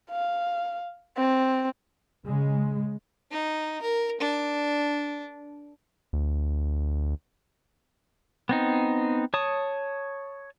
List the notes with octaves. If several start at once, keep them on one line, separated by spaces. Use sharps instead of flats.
F5
C4
C#3 G#3
D#4
A#4
D4
D2
B3 C4 D#4
C#5 A5 D#6